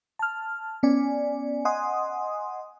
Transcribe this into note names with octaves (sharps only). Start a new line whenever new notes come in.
A5 F6
B3 C#4 D5 G#5
D#5 F#5 G#5 C6 D#6